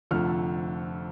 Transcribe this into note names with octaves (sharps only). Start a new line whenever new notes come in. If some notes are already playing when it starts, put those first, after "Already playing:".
F1 F2 D3 F3 A3 F6